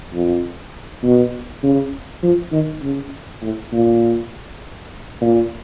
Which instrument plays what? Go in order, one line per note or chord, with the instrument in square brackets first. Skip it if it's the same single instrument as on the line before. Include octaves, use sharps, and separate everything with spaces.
[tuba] F2
B2
C#3
F3
D#3
C#3
A2
A#2
A#2